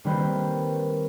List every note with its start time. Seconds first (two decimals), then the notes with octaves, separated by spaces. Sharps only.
0.04 D#3 G3 A#3 C4 B4 C5